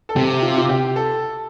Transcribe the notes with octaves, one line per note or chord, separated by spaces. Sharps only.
A4
C3 G4
F4
F4
G4
A4